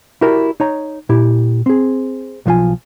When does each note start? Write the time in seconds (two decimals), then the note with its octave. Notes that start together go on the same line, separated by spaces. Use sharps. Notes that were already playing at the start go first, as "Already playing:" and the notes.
0.21 E4 F#4 G4 A#4 D5
0.60 D#4 C#5 A#5
1.09 A#2 E4 G4
1.66 C4 G#4
2.46 B1 F3 G#3 F4 G#5